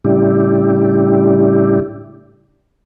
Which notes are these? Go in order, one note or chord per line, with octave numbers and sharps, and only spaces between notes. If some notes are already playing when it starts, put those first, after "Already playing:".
A2 C#3 G3 D4 E4 G4